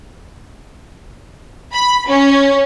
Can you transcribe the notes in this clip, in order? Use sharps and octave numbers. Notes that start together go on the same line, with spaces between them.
B5
C#4